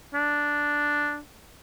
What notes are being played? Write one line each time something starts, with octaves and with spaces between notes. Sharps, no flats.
D4